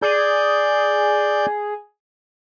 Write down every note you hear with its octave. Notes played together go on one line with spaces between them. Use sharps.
G#4 D5 G6